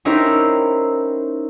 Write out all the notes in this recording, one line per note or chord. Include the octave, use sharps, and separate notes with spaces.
C#4 D#4 E4 G4 A#4 C5